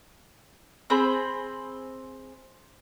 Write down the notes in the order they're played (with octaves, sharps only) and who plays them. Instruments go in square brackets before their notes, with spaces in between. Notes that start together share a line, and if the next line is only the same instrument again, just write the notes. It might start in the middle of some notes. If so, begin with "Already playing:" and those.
[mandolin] C4 G#4 C5 B5